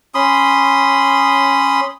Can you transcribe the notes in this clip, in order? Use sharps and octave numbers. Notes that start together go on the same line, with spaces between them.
C#4 B5 C6 D#6